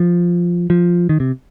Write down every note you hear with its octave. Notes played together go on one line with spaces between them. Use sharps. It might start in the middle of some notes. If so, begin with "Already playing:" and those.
Already playing: F3
F3
D#3
C3